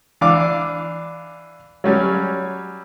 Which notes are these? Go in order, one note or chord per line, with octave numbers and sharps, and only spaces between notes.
E3 D4 F5 D6
F#3 G3 C#4